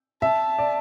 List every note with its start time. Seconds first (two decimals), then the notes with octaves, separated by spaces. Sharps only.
0.22 E5 A5
0.59 D5